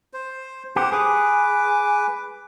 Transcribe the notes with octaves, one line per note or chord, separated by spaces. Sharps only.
C5
G4 C5 F#5
G#4 B4 D6